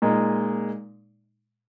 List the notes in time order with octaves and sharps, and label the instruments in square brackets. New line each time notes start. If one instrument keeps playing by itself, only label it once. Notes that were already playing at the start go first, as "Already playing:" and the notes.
[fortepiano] A#2 G#3 D#4